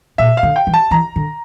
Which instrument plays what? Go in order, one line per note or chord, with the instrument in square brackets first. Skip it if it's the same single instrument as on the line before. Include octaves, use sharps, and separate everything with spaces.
[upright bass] A#2 [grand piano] E5
[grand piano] F5
[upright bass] D3
[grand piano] G5
[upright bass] E3
[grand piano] A5
[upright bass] E3 [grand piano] A#5
[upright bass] D3